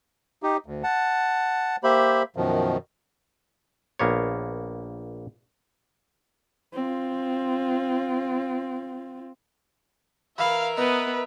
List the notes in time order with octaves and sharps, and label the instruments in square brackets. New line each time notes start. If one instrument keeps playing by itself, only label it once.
[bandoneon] D#4 G4
D2
F#5 A5
A#3 G4 C5 E5 B5
F#2 B2 D#3 F3
[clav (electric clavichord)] A#1 A#3 B3 C#5
[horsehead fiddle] C4 F4
[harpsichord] E3 B5 [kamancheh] A#4 E5 [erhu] F5
[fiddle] B3 [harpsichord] D#4 [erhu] B4